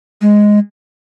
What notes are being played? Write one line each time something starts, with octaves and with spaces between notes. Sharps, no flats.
G#3